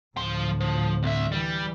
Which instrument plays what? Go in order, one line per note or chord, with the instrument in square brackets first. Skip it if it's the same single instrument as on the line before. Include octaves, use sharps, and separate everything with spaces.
[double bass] D2 A2 [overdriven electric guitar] F3 C6
[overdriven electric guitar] F3
C2 E5
[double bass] E3 [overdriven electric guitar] G3